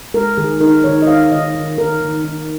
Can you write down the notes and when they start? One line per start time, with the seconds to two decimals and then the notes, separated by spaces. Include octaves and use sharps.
0.14 G#3 A#4
0.37 D#3 G#4
0.61 D#4 A#4
0.84 D#3 C#5
1.02 D#5
1.08 D#4 F5
1.31 D#3 D#5
1.55 D#3
1.78 D#3 A#4
2.01 D#3
2.25 D#4